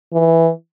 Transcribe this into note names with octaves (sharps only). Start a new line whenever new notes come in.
E3